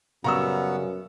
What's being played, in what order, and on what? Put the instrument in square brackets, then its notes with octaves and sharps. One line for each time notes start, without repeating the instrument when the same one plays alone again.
[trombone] F#2 [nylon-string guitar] C#3 G3 [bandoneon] B3 [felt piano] A#5 C#6 E6